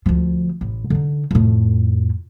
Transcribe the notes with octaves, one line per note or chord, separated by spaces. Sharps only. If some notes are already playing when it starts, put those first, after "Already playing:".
D2 F3
A1
D3 D#4
F2 A2